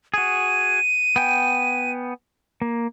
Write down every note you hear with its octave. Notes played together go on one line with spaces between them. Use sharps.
F#4 G#4 D#7
B3 G5 G#5
A#3